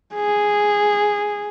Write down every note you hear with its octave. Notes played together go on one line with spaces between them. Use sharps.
G#4